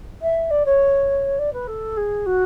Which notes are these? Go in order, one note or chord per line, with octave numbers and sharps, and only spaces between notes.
E5
D5
C#5
D5
B4
A4
G#4
F#4